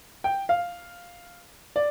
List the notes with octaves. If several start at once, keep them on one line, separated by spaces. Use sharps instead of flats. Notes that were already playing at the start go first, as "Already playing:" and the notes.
G5
F5
D5